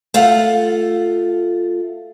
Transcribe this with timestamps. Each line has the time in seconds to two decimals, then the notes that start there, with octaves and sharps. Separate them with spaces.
0.14 A3 F4 A4 F#5